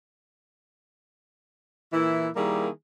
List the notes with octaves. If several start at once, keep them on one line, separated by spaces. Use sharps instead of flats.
A#2 E3 E4
D#3 G3 A#3 E4 G#4